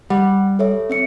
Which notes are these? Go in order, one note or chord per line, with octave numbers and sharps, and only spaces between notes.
G3 F#5
A4 C#5 E5
C4 E5 C#7